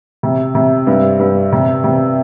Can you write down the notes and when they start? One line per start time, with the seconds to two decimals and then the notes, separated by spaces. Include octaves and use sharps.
0.23 C3
0.55 C3
0.87 G2
1.19 G2
1.52 C3
1.84 C3